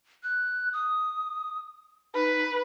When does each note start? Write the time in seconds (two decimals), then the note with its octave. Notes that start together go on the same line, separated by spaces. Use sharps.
0.23 F#6
0.73 D#6
2.15 D#4 B4